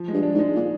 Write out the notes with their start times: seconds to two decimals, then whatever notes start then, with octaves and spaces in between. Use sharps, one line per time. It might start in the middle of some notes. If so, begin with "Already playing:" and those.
Already playing: F3
0.08 G#3
0.13 G2
0.23 D4
0.34 G#2
0.39 G#3
0.55 A#2